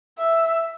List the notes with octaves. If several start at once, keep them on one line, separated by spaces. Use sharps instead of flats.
E5